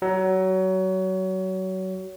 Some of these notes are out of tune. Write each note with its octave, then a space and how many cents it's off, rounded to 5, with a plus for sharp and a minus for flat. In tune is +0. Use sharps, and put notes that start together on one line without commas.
F#3 +25